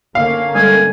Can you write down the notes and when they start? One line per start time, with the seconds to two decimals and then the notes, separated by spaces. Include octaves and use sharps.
0.15 D3 A#3 C#4 F5
0.55 G3 G#3 A4 G#5